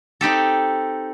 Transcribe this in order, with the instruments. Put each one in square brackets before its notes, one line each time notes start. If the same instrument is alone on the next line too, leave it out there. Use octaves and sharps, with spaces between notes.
[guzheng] C4 D#4 G4 A4